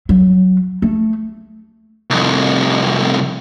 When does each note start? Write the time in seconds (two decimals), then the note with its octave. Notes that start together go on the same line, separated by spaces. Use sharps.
0.09 F#3
0.82 A3
2.10 C2 F2